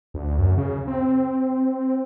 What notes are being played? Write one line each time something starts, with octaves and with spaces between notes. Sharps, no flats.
D2
F#2
C#3
C4